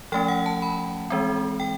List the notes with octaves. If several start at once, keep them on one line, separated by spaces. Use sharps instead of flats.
F3 A3 C#4 G5
F#5
A5
B5
E3 G#3 C4
G5